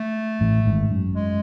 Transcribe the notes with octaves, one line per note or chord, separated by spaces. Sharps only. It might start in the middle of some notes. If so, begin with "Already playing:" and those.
Already playing: A3
A1 A2
G#1 G#2
F#2
G#3